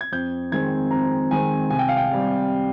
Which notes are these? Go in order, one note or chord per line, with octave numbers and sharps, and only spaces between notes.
G#6
F2 G6
D#3 G#3 C4 G#6
F2 A#5
D#3 G#3 C4 G#5
C2 G#5
G5
F5
G5
C3 G3